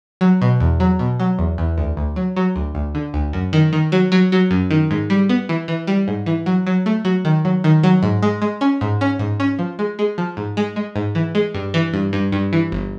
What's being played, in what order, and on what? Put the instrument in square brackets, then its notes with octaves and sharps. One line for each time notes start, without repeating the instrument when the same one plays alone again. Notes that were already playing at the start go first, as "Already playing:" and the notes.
[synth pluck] F#3
B2
E2
F#3
B2
F#3
E2
E2
D2
D2
F#3
F#3
D2
D2
D3
D2
F#2
D#3
D#3
F#3
F#3
F#3
F#2
D#3
G#2
G3
B3
E3
E3
G3
G#2
E3
F#3
F#3
A3
F#3
D#3
F#3
D#3
F#3
G#2
G#3
G#3
C#4
G#2
C#4
G#2
C#4
F3
G#3
G#3
F3
G#2
G#3
G#3
G#2
E3
G#3
G2
E3
G2
G2
G2
E3
G1